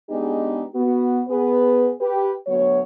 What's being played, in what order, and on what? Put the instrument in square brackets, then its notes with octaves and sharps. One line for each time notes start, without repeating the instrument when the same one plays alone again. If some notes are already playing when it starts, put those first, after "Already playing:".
[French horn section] G#3 B3 D4 D#4 G4 G#4
B3 F#4
B3 G#4 B4
G4 B4
D2 F#3 B3 C#5